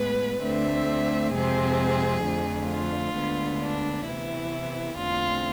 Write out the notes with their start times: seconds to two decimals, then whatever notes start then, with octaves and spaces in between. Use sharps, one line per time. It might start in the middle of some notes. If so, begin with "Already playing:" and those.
Already playing: A2 G#3 B3 B4
0.43 D2 D3 A3 C4 E5
1.34 F2 C3 G#3 C4 G#4
2.24 F2 D3 F3 A3
2.71 F4
3.16 D2 D3 G#3 B3
3.61 D4
4.07 C3 E3 B3 E4
4.97 E2 D3 A3 C4 F4